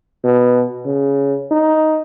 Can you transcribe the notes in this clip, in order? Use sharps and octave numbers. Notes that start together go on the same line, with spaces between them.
B2
C#3
D#4